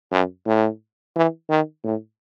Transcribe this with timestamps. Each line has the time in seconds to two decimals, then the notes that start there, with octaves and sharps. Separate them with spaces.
0.12 F#2
0.46 A2
1.16 E3
1.50 D#3
1.84 A2